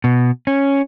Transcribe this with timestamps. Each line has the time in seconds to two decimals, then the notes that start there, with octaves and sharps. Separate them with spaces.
0.04 B2
0.47 C#4